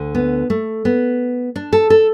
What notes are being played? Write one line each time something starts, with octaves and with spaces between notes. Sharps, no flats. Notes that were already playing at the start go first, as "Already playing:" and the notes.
Already playing: D2 D3
B3
A3
B3
D4
A4
A4